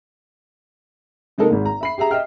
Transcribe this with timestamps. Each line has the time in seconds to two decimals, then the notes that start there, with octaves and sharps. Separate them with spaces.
1.38 C3 G#3 A#3 D#4 A4 A#4
1.51 G#1 G#2
1.65 A#5
1.81 E5 B5 C7
1.98 G4 G#4 E5 A#5
2.11 D#5 E5 G5 F6